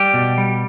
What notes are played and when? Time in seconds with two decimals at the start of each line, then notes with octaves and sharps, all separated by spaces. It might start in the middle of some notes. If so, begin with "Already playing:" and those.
Already playing: G3 G4
0.14 B2
0.38 G3